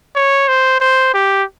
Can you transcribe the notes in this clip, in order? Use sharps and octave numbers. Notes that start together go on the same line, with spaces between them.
C#5
C5
C5
G4